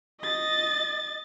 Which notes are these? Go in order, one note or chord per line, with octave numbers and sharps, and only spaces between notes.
D#5 A6